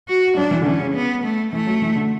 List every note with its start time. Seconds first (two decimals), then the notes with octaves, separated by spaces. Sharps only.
0.08 F#4
0.37 F#3 D4
0.51 E3
0.61 D3
0.66 E3 C#4
0.80 C#3
0.95 B3
1.24 A3
1.52 E3 A3
1.67 F#3
1.82 E3
1.96 D3